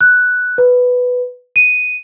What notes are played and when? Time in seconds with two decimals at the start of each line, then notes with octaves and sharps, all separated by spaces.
0.01 F#6
0.58 B4
1.56 D#7